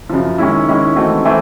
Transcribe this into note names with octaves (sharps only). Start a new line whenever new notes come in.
F#2 C#3 F3
D#3 G#3 C#4 E4
D#3 G#3 C#4 E4
E3 A3 C4 D#4 F#4
E3 A3 C4